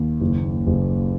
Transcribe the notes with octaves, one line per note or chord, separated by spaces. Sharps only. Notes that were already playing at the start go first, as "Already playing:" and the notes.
Already playing: D#2
F#1
F#1